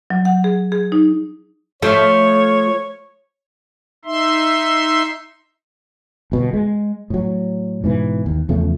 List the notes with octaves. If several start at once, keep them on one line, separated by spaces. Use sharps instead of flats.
F#3
F#5
G#4
G#4
D#4
F3 A3 C#5
D#4 E5 C6
G1 B2
G#3
A2 F#3
G#2 B2 E3
D#2
E2 C#3 F3 A3